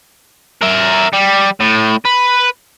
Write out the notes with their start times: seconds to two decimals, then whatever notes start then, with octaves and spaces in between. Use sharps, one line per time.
0.61 A#4 E5
1.13 G3
1.60 A2
2.05 B4